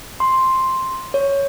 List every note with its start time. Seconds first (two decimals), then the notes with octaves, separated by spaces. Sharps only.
0.20 C6
1.14 C#5